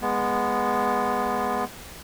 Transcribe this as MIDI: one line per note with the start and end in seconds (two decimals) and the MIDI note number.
0.02 1.64 56
0.02 1.64 59